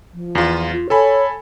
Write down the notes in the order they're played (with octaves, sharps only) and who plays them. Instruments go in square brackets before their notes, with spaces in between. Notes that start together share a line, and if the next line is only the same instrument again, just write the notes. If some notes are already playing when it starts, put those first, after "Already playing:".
[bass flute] F3
[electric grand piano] E2 F4
[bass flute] F4
[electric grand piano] A4 G#5 B5 [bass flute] C#5